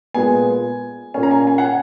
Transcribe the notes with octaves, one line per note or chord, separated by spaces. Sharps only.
A#2 G#3 B3 G#5
A#2 A#3 C#4 G#5
A#5
G#5
G#5
F#5
G#5